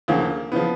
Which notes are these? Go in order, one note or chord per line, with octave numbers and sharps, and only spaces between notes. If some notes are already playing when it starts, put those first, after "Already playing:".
D2 C#3 F3 A#3
C#3 F3 B3